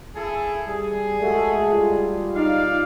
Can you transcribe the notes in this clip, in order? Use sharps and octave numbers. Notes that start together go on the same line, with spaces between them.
E4 G#4 A4
G3 G#4
G#3 A3 F#4 A4
G3 F4
D#4 D5 F5